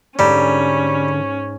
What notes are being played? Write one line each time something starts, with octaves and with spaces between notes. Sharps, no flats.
G#2 D3 G3 C#4